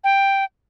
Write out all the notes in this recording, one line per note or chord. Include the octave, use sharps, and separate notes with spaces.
G5